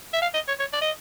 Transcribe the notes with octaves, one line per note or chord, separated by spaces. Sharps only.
E5
F5
D#5
C#5
C#5
D5
D#5